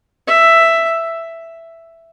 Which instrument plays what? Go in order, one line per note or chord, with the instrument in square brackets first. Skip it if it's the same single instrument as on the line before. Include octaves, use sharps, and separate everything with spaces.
[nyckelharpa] E5